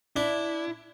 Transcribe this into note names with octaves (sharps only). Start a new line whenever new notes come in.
D4 E4